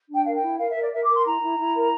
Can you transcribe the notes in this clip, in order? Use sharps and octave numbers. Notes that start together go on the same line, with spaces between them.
D4
G5
A#4 F5
G5
E4
A#4 F5
E5
A#4
D5
A#4 E5
D6
A#4
C6
E4 A#5
E4
E4
A#4